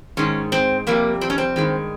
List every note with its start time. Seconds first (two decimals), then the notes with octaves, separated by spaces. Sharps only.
0.17 G#2 D#3 G#3 C#4
0.52 C4
0.87 F2 C3 G3 A#3
1.21 C4
1.30 C#4
1.38 C4
1.56 G2 D#3 G#3